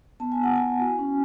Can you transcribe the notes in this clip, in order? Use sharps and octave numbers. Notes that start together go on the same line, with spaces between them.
B3 A5
G#5
B3 F#5
E4 G#5
F#4
C#4